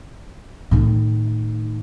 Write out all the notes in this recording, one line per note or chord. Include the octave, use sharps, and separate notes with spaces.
A2 D#3